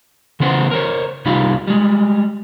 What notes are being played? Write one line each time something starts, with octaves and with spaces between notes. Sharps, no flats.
C#3 E3 B3 C5 F#5 C6
A#4 C5 C#5
C2 G3 D#4 F4 F5 B5
G3 G#3